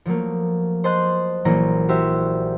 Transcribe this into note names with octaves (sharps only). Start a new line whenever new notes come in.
F3 F#3 A3 A#3
C5 D#5 A5 C6 F#6
A#1 E3 F#3 A#3 A#5
F#4 G4 C5 E5